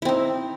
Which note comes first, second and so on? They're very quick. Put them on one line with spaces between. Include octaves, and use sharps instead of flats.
E4 C4 D#4